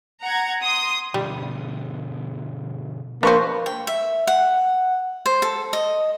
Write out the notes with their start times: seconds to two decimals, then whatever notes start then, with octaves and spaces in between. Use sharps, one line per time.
0.22 F#5 A#5 G#6
0.62 C6 D#6
1.14 B2 D3 F3 G3
3.23 F3 A#3 D4 B4 C5 C#6
3.66 G5
3.87 E5
4.27 F#5
5.26 C5
5.42 A4
5.73 D#5